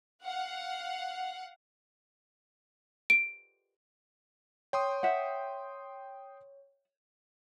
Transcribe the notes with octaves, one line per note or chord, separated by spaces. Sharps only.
F5 F#5
D7
C#5 G5 C6 D#6
E5 F#5